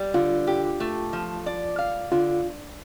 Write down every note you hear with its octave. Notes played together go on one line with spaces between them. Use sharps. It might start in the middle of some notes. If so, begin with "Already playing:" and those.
Already playing: G3
D3 F4
G4
A3
F3
D5
F5
D3 F4